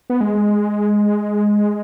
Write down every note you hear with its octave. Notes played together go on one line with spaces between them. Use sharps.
B3
G#3